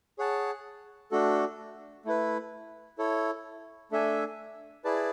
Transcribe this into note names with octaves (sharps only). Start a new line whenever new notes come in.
G#4 C#5 F#5 A5
A3 D4 F#4 A4
A3 E4 B4
E4 A4 C#5
A3 D4 A4 E5 G#5
E4 G#4 B4 D5 A5